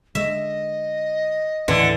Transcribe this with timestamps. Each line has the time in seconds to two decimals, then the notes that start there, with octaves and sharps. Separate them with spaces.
0.15 D3 G#3 D#5 E5
1.68 D#2 A2 D3 E3